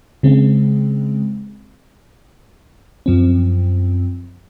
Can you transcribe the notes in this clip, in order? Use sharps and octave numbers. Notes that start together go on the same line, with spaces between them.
C#3 G#3 C4
F#2 F3 C4